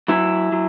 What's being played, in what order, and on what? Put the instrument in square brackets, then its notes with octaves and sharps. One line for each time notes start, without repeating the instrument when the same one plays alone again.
[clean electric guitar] F#3 E4
F#3